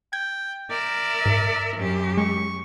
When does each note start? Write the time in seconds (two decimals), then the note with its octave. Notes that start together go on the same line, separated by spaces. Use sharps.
0.13 G5 G#6
0.71 A#4 D5 E5
1.25 G#2
1.77 F#2 G4
2.17 G#3 C#6